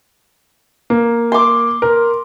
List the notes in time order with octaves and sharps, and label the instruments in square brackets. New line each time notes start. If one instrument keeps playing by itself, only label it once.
[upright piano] A#3
[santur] C6 D6
[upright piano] A#4